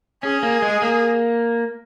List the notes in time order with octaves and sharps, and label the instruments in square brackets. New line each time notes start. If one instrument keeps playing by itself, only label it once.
[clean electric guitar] C#4 [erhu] G#4
[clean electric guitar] A#3
G#3
A#3